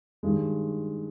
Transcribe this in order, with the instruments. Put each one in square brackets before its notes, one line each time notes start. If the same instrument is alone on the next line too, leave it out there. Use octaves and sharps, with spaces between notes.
[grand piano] G2 D#3 G#3